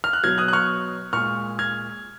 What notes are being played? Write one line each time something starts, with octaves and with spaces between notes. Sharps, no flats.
F6
F#6
B2 F#3 F6 G#6
D#6 F#6
F#6
C#6 F6
A#2 G#3 C#6 F6
F6 G#6